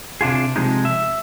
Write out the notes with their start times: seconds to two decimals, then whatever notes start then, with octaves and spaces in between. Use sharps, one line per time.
0.21 C3 D4 F4 G#4
0.56 C3 F3 G#3 D#4
0.85 E5